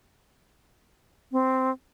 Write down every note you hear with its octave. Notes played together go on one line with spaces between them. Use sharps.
C4